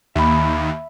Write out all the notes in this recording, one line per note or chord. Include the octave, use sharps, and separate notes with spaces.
D#2 E5 B5